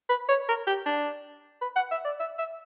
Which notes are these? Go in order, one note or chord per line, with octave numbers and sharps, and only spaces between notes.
B4
C#5
A#4
G4
D4
B4
F#5
E5
D5
E5
E5